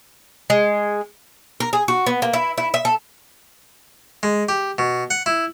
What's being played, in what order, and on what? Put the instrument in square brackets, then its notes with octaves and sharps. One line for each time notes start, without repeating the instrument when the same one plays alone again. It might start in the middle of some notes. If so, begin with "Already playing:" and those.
[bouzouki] G#3
A#4
G#4
F#4
B3
A#3
E4
E4
E5
A4
[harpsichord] G#3
G4
B2
F#5
E4